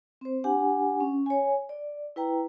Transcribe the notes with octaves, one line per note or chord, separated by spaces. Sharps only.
C4 C5
D4 G4 F#5 G#5
C#4
C#5 G#5
D5
E4 B4 G5 A#5